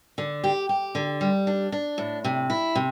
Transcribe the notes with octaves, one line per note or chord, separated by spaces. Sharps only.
D3
G4
G4
D3
G3
D4
D4
A2
C3
E4
C3